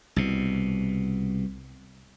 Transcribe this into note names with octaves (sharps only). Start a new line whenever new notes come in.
C2 B2